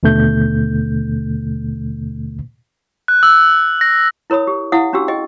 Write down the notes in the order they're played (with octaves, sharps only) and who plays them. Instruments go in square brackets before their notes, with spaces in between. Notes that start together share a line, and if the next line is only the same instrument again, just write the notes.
[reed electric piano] D#2 B2 D3 A3 G6
[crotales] F#6
E6
A#6
[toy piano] E4 A#4 C#5 B5 D#6
G4
E4 F5 F#5 D#6
C#4 D4 F#4 G4 E6
G#4 D#5 G5